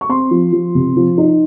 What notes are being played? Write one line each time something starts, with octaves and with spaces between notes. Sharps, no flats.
C#6
C4 C6
F3
F3
C3
F3
D#4